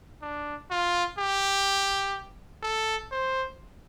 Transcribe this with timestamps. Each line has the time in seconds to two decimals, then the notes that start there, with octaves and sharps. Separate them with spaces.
0.22 D4
0.70 F4
1.18 G4
2.63 A4
3.11 C5